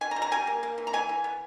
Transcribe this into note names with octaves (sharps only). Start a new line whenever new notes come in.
B2 G#5
A#5
B2
A#5
G3 G#5
A#3
A#3
E3
A#5
E3 G#5
E3
B3